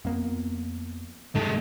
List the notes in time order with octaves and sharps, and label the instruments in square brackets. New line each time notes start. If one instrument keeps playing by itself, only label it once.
[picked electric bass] F2 A#3 B3
[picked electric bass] G2 C3 D#3 [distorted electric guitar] G#3 A4